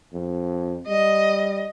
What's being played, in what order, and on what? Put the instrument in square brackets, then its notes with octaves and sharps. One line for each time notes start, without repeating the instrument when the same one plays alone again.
[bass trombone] F2
[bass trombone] G3 [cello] D#5